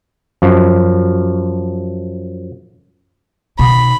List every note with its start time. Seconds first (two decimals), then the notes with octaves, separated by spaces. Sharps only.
0.42 F#2 F3
3.59 B2 D#3 B5